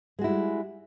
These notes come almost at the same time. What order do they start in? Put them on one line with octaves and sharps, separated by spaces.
G#3 F#4 E4 G3